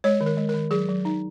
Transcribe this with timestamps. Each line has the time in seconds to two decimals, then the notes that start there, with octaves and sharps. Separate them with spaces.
0.04 G#3 C#5
0.21 D#3
0.26 A#4
0.37 G#3
0.49 D#3 A#4
0.71 F#3 G#4
0.89 F#3
1.05 D#4